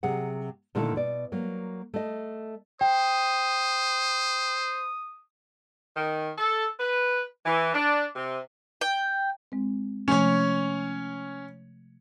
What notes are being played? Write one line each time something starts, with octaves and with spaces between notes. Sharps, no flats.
C3 F#3 G#4 F#5
A#2 D3 D#3 A3 E4 A4
B2 D5
F#3 A#3
A3 D#5
C5 G5 D#6
D#3
A4
B4
E3
D4
C3
G5
G#3 C4
C3 F3 A3 C#4 C#5